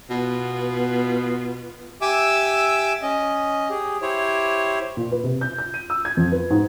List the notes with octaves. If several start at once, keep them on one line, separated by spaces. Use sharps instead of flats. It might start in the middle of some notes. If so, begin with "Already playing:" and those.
B2 B3 F4
G4 E5 G#5 D6 E6
C#4 D#5
G4 G#4
E4 G4 C5 C#5
A#2
B4
C3
G6
G6
D#7
E6
G#6
F2
B4
G#2